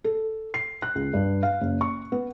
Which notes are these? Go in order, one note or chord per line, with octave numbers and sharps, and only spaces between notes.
A4
C7
F#6
C#2
G2
F5
F#1
C#6
B3